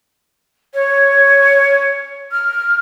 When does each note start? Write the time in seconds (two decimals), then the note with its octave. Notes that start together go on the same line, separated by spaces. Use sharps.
0.73 C#5
2.31 F6